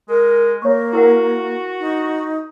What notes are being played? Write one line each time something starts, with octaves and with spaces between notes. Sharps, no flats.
G#3 A#4
A#3 C#5 C#6
E4 F#4 A#4 F#5
D#4